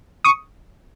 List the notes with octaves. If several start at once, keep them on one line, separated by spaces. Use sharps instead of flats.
C#6 D#6